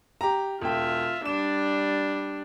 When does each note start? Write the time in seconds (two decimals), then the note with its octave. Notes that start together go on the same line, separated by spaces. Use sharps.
0.21 G4 A#5
0.61 E1 F4 E5 G5
1.25 G3 D4 E7